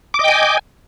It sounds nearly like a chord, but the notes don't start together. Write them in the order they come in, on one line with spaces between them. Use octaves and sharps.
D6 D#5 G5 G#5